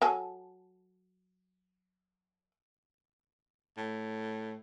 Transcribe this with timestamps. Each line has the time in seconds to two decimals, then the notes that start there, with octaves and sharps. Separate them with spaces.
0.02 F#3 G#4 A4
3.77 A2